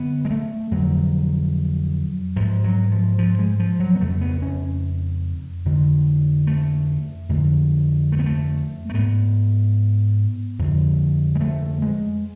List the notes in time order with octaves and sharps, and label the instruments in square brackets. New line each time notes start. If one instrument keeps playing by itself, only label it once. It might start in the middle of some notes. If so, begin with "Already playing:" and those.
Already playing: [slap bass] F#2 D3 B3
G#3
A3
F2 D3 F#3
G#2 F3
F#3
F3
F3
G#3
F3
F#3
B3
F2 C#3 A3
B3
C#4
F2 D3
A3
F2 D3
A3
B3
A3
A3
G#2 B3
F2 D3
G#3
A3
G#3